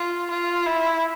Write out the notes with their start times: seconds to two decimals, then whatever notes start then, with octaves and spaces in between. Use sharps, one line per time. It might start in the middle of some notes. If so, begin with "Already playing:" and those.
Already playing: F4
0.30 F4
0.66 E4